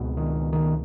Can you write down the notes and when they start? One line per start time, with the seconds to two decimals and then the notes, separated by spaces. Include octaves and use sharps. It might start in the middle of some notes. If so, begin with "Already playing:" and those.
Already playing: C#2 B2
0.17 D#3
0.53 D#3